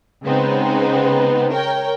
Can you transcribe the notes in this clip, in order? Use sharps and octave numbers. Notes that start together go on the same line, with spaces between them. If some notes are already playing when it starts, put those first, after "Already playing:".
C#3 G#3 B3 C4 D#4
A#4 C#5 G5